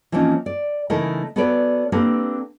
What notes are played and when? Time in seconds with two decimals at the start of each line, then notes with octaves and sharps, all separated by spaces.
0.12 E3 F3 A#3 C4 C#4 D#4
0.46 D5
0.90 C#3 E3 A3 D#4 E4 A#4
1.36 B3 F#4 A4 B4 C#5 D5
1.92 A#3 C4 D4 G4 A4 B4